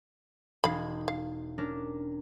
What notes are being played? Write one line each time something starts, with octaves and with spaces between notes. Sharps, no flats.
E1 D#4 F5 B5 G#6
F5
C#4 D4 A#4